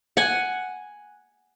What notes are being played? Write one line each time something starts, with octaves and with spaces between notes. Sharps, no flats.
F#5 G#5